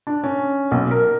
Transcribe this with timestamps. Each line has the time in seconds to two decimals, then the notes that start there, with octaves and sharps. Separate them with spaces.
0.07 D4
0.24 C#4
0.71 B1
0.91 A#4